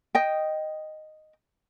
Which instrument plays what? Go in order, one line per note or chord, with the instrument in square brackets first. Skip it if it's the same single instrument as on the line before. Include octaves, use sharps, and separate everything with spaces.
[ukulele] D#5 G5